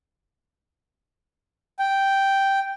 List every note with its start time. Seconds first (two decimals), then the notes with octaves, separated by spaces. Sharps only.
1.79 G5